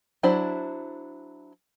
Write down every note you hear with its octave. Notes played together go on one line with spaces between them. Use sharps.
F#3 D4 E4 C5 D5